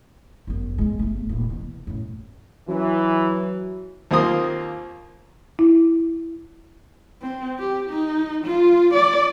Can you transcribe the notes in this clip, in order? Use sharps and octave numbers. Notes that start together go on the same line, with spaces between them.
G1 F#2
B1 G#3
G1 A3
D#1 A#2
B2 E3
F#2 A2
E3 F#3
D#2 A#3 C4 F4 C6 D#6
E4
C4
G4
D#4
F4
D5